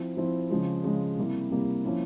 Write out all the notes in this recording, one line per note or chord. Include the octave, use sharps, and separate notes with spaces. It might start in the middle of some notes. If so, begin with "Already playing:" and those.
Already playing: F3 C4 E4
F3 C4 E4
C#3 F3 G#3
C#3 F3 G#3
C3 G3 A#3 E4
C3 G3 A#3 E4
F3 A#3 C#4 E4